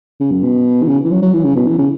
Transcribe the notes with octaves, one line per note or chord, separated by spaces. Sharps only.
C#3
F#2
B2
E3
C#3
E3
F#3
F#3
E3
C#3
B2
E3
C#3